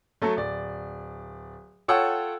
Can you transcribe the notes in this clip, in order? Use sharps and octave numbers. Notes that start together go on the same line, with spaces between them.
F#3 A3 A4
D1 D5
F4 A4 C#5 F#5 G5 E6